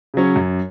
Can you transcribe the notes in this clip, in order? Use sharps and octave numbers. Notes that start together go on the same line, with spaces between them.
C#3 F#3 C#4
F#2